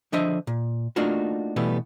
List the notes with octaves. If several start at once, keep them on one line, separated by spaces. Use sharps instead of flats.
D3 F3 D4 C5 D#5 E5
A#2
A3 A#3 D4 D#4 F4 F#4
B2 E3 G3 A3 B3